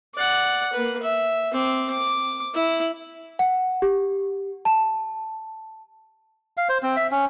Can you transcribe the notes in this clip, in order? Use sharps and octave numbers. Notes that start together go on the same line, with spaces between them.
D5 F#5
A#3 B4
E5
C4 D6
D6
E4
F#5
G4
A5
F5
C5
C4
E5
C#4